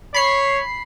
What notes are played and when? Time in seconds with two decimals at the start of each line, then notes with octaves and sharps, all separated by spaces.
0.14 C#5 B5 C7